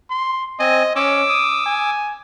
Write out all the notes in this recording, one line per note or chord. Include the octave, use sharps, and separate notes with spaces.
C6
C4 D#5 G#5
C#4 D6 E6
D#6
G#5